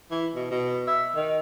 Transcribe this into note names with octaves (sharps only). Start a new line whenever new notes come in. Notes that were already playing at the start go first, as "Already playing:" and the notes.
E3
B2
B2
E5
D#3